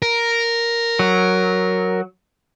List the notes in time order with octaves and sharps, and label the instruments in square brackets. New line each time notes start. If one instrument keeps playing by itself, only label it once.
[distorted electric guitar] A#4
[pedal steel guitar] F#3